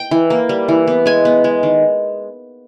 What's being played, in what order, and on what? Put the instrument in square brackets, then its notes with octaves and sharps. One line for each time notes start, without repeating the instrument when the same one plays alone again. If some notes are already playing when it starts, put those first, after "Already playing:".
Already playing: [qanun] G5
E3
A#3
G3
E3
B3
G#3 G#5
B3
G#3
D#3